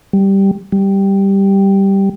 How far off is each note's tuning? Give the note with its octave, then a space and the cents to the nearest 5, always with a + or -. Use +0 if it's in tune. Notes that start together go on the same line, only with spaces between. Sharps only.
G3 -5
G3 +0